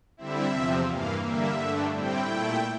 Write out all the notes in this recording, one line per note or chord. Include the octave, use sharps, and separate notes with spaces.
D3 G3 C4 E4 E5
E2 C3 F3 C4
G2 E3 A#3 F5
D3 G3 A#3 E5
G2 D3 A3 D4
A2 G3 C4 E4 G5
A#2 A3 E4